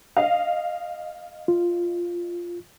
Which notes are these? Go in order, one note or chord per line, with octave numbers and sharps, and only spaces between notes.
D#5 F5
F4